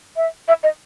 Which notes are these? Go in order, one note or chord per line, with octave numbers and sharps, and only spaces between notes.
E5
E5
D#5